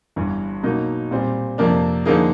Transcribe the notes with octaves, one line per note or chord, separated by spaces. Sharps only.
G1 G2 E3
B2 F#3 A#3 D#4
A#2 G3 C4
F2 C3 F3 A#3 D4
D3 F3 A#3 D#4 G#4